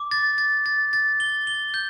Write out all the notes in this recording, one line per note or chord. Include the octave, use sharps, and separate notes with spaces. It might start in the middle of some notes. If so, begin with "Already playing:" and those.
Already playing: D6
A6
A6
A6
A6
G7
G7
G6